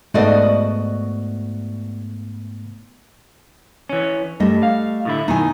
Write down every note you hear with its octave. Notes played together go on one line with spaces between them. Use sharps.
G#2 A3 B3 F#4 D5 D#5
E3 C#4
G2 G3 A3 D#5
F5
A2 D3 E4
B2 D#3 D#4 E4 G#5